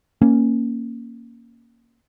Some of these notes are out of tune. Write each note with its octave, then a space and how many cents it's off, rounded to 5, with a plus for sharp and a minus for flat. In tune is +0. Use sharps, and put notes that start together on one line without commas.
A#3 +0 C#4 -10